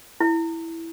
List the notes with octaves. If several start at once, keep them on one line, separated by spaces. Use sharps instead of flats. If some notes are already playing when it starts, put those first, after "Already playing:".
E4